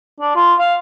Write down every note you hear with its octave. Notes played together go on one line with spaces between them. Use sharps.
D4
F4
F5